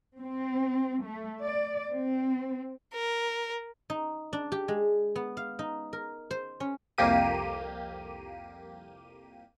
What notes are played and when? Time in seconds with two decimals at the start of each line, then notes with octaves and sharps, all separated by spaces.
0.17 C4
1.04 A3
1.42 D5
1.91 C4
2.94 A#4
3.90 D#4
4.33 D4
4.52 G4
4.68 G#3
5.16 B3
5.37 F5
5.59 D#4
5.93 A#4
6.31 C5
6.60 C#4
6.98 C2 F2 A#3 G4 D#7